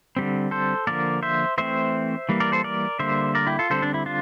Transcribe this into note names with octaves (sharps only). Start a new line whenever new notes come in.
D3 G3 C4
A4 C5
D3 F3 A#3 A#4 D5
C5 E5
E3 A3 C4 C5 E5
E3 G3 A#3
A#4 D5
A4 C5
A#4 D5
D3 G3 A#3 C5 E5
A#4 D5
E4 G4
F4 A4
D3 G3 C4 A4 C5
D4
E4
D4 F4